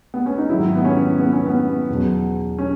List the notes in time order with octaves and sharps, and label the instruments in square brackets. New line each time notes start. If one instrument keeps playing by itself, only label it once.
[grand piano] B3
C#4
D#4
G#2 D#3 F#3 E4
B3
C#4
B3
C#4
B3
E2 B2 F#3
C#4